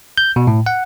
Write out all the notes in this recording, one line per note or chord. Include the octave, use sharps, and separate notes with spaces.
G6
B2
A2
F#5